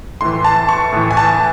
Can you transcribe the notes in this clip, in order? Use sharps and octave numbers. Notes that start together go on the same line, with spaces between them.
A2 E3 C6
A5
C#6
A2 E3
G#5
A5